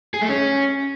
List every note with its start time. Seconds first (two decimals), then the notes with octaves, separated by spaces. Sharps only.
0.14 G#4
0.21 A3
0.29 C#4